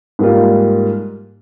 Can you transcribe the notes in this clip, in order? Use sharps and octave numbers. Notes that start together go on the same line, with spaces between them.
G#2 G3 A#3 F4